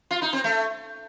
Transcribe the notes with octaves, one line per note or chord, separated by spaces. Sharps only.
F4
D#4
C4
A3